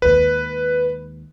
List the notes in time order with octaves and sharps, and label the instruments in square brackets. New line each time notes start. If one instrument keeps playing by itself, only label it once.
[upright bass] D#2 G#3 [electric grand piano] B4